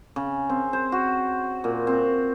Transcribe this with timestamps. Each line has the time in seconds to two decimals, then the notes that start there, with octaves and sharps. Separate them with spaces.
0.16 C#3
0.49 C4
0.73 C5
0.92 F#4
1.64 A#2
1.87 C4